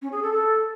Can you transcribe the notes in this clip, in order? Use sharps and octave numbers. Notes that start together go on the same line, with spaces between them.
C#4
G#4
A4
A4